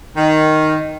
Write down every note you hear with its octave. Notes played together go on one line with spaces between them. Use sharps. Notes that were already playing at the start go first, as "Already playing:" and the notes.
D#3